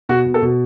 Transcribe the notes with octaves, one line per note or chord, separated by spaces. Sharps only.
B2 F#4
B2
A4
B2